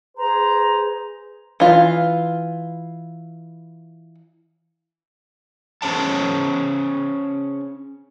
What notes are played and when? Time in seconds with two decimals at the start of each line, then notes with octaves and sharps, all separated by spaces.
0.17 G#4 B4 C5 A#5
1.60 E3 F4
5.82 C#4 G#4 C5 C#5 A5